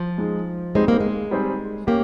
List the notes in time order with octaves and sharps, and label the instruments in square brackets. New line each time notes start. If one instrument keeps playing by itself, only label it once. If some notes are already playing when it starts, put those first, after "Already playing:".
Already playing: [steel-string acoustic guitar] F3
[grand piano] G#3 D#4 G#4
[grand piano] G3 C4 D#4 G#4 C5 [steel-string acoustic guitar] G#3
[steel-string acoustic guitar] A#3
G#3
[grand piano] G3 C4 D#4 G#4 C5
[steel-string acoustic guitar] A#3 [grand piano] C#4 G4